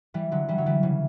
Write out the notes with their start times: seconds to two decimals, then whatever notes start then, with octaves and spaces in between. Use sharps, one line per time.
0.14 E3 G3
0.31 D3 F#3
0.48 E3 G3
0.58 F#3
0.66 E3 G3
0.83 C#3 E3